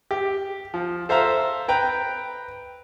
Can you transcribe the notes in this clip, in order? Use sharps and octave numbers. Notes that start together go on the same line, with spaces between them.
G4
F3
A4 C5 E5 F5 A#5
B4 G5 A#5